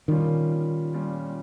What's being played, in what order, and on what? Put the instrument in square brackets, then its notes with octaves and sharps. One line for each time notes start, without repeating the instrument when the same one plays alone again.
[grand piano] A#2 G3 C#4 F4 [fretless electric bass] D#3
[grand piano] A#2 G3 C#4 F4